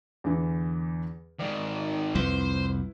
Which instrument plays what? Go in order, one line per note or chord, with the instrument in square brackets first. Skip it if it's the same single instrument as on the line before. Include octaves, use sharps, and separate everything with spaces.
[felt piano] E2 D3 E3
[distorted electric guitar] G#2 D#3 [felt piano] D5 F5 D6
[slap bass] C2 F2 [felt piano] E4 B4 [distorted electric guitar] C5